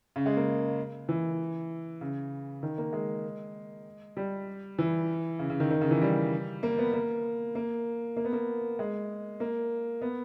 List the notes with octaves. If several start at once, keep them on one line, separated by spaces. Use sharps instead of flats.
C#3
G#3
A#3
E3
C#3
D#3
A#3
G#3
G3
E3
C#3
C#3
D#3
D#3
C#3
E3
G3
A#3
B3
A#3
A#3
A#3
B3
A#3
G#3
A#3
B3